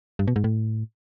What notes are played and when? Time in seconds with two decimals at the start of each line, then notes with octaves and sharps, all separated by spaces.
0.19 G2
0.28 B2
0.36 G#2
0.44 A2